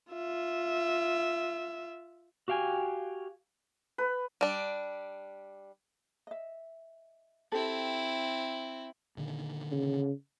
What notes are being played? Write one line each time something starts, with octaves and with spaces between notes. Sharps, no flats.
F4 E5
F#4 G4 F5 G5 G#5
B4
G3 D4
D#5 E5
C4 E4 G4 A4
A#2 D3 D#3
C#3